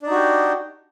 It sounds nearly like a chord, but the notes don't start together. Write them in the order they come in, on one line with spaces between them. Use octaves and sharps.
D4 D#4 F#4 G4